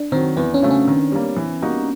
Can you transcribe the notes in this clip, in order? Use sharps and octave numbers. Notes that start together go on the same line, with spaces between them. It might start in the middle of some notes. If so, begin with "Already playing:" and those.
Already playing: D4
D#3 F#3 C4
E2 B3
C#4
C#3 F#3 A3
C#4
D#3
G3 A#3
E3
G3 A#3 D#4 F#4